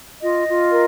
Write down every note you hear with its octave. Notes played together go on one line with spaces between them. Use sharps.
F4 D#5
F4
A#4